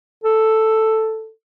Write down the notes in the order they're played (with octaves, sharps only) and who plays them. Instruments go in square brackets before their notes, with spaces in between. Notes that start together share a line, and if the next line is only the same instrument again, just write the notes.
[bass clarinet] A4